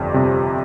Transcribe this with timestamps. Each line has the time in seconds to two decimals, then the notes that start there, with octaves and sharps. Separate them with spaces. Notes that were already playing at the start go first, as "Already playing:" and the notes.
Already playing: G1 F2 G3
0.14 C3